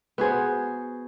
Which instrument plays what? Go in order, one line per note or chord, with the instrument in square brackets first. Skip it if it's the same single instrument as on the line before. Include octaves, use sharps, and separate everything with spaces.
[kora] B3 F#4 G#4 C5